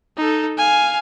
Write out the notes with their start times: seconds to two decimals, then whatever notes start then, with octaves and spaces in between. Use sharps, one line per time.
0.17 D#4 A4
0.57 F5 G#5